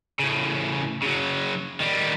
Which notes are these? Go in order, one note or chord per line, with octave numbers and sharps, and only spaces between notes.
A2 C#3
C#3 F#3
D#3 G3